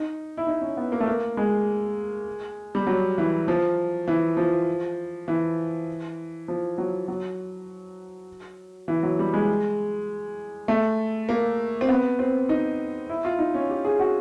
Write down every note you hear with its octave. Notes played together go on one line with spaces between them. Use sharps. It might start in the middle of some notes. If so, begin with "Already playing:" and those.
Already playing: D#4
E4
D#4
C#4
B3
A#3
A3
A#3
G#3
G3
F#3
E3
F3
E3
F3
E3
F3
F#3
F#3
E3
F#3
G3
G#3
A3
A#3
C4
B3
C4
D#4
E4
F4
D#4
C#4
G4
G#4
F#4